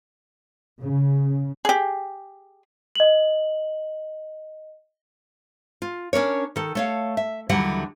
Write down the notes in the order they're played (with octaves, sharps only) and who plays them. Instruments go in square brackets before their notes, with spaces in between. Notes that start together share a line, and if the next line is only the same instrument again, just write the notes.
[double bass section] C#3
[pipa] G4 G#4
[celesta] D#5 F#7
[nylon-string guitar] F4
C#4 D4 A#4 C#5
D#3 A4
A3 C#5 F5
E5
D#2 D3 E3 F#3 G3 F#5